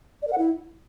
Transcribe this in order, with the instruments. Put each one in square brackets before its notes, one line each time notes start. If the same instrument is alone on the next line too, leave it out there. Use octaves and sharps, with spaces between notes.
[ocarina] D5
A#4
F#5
E4